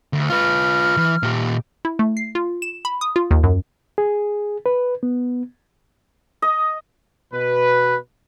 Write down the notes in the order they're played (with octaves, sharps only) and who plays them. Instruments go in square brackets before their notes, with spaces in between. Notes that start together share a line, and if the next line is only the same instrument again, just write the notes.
[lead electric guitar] D2
[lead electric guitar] F4 B4 [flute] F6
[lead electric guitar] E3
A#2 G4
[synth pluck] E4
A3
C7
F4
E7
B5
D#6
F4
D#2
F#2
[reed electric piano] G#4
B4
B3
[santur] D#5
[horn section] B2 B4